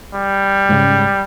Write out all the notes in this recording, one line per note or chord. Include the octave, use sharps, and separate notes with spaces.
G3
G#2 C#3